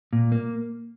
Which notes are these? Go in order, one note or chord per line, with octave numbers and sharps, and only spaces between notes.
A#2
A#3